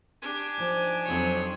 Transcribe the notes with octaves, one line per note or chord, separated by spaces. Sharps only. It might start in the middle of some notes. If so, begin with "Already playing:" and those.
D4 G4 G#5
F3 D#4
F2 F#3 C#5